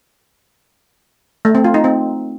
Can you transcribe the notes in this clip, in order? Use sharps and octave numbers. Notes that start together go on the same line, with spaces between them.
A3
C4
F4
D#4
C4